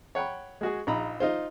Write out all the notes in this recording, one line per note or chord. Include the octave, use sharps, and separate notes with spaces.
C#5 F#5 G5 B5
G#3 F#4 G#4
A#1 D#4 A#5 B5
D#4 F4 C5